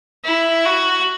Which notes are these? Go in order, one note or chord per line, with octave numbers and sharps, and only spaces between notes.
E4
F#4